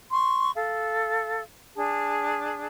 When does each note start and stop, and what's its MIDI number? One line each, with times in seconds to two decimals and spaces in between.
0.12 0.51 84
0.12 0.51 85
0.56 1.43 69
0.56 1.43 77
1.76 2.67 62
1.76 2.67 68
1.76 2.67 81